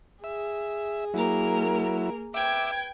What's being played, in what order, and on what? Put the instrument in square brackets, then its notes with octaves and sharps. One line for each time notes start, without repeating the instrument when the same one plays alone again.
[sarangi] G#4 [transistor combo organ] E5
[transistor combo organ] F#3 E4 [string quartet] A#3 A#4
[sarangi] B4 [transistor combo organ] E5 D6 [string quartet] G5 G#6